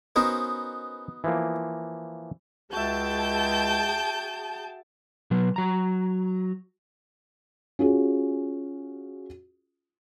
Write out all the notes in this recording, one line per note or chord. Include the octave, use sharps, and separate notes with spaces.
B3 C#4 D#4 F#4 A#4 C5
E3 F3 A#3
C#2 F#4 G#4 E5 G5 A5 G6
B2 F#3
F#3 A#5
C#4 F4 F#4 G#4